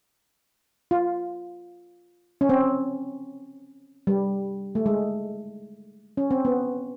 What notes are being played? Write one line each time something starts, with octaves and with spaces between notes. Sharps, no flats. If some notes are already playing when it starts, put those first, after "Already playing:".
F4
C#4
C4
G3
A3
G#3
C#4
C4
B3